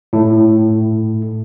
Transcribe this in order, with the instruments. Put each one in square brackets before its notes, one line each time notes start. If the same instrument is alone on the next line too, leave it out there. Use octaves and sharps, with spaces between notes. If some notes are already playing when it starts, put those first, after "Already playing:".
[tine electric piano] A2